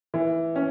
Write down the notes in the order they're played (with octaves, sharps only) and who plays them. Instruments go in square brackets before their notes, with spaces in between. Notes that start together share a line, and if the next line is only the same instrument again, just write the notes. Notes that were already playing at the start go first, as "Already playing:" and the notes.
[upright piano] E3
C#4